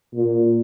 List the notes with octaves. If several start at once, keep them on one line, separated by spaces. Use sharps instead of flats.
A#2